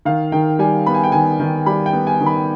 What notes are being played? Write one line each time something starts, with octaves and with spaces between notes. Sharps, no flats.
D#3 F5
D#3 G5
G3 G#5
B3 B5
G#5
G5
D#3 G#5
D#3
G3 B5
G5
B3
G#5
D#3
B5